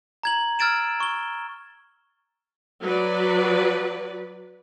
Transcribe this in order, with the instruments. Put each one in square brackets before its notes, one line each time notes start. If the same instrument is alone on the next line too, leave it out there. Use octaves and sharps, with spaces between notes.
[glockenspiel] A#5 G#6 F#7
E6 F6 G#6 A6 D7 E7
C#6 G7
[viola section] F#3 B4 D5